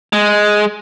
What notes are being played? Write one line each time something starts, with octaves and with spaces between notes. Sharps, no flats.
G#3